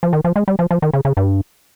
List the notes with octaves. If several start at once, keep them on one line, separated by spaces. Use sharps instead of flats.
F3
D#3
F3
G#3
G3
F3
F3
D#3
C#3
C#3
G2